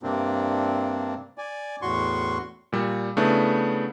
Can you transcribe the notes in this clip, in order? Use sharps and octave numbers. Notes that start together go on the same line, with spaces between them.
G2 C3 A#3 C4 D4
D5 G#5
E2 A2 F#4 C6 C#6
A#2 G3
C#3 A3 B3 D4 E4